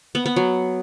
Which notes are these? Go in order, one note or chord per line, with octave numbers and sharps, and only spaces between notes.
B3
B3
F#3